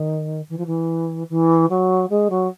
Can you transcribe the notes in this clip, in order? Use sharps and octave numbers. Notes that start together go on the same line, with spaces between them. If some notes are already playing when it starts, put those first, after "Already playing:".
Already playing: D#3
E3
F3
E3
E3
F#3
G#3
F#3